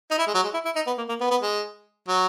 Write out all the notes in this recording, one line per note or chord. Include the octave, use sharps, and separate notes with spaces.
D#4
E4
G#3
F#3
G#3
E4
E4
D#4
B3
A#3
A#3
B3
B3
G#3
F#3